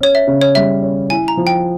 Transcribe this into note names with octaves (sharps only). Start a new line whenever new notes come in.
C#4 C#5
E5
C#3
C#5
G3 E5
C#4
E4 G#5
A#5
F3
G5